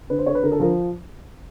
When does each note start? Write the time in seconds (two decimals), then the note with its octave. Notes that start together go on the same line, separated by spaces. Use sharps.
0.10 D3 B4
0.18 C5
0.26 D3 C#5
0.35 B4
0.43 D3 A#4
0.52 A4
0.60 F3 A#4